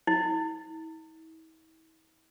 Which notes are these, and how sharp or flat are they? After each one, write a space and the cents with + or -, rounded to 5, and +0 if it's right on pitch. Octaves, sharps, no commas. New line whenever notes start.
E4 -45